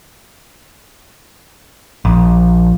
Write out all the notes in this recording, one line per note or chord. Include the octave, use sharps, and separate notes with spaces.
A#1